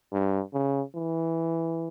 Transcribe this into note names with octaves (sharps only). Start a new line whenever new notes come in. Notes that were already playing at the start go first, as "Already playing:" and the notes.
G2
C#3
E3